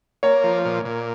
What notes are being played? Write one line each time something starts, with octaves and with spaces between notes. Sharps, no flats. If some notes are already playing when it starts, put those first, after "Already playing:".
A#3 C#5
F3
A#2
A#2